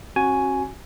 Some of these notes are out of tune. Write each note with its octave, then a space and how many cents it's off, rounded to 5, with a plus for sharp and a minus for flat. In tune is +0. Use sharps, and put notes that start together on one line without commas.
C#4 -40 F#4 +0 G#5 +5